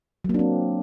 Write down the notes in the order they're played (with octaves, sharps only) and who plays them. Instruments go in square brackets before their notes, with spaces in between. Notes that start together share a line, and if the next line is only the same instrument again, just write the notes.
[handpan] F#3
A#3
D4
C4